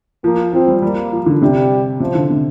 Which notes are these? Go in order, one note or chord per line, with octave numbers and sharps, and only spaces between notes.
F3 A#3
F3 C4
G3
G3 A#3
F3
D3
C3 G3
C3 F3
D3
C3